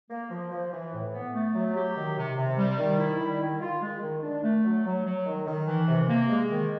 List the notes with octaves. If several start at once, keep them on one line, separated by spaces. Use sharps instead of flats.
A#3
F3
F3
E3
A2
B3
A3
F#3
G4
D#3
C3
C3
G3
D#3
E4
G3
D#3
F4
G#3
D#3
D4
A3
F#3
F#3
F#3
D#3
D#3
E3
C3
A#3
G#3
D#3